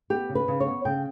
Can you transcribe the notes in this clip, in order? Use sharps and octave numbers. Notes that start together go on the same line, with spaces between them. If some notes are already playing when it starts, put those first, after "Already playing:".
B3 G4
C#3
B4
C#3
C#5
B3
C#3 G5